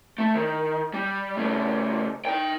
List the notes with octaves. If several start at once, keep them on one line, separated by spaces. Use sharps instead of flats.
A3
D#3
G3
C#3 A3
D#4 G5